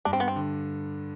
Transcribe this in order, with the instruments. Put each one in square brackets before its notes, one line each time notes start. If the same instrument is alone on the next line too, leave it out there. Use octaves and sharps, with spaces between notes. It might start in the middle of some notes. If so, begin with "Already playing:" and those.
[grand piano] G2 [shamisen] D4
[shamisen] C4
B3
C4
[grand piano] D3